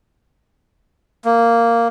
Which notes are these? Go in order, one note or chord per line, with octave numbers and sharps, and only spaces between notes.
A#3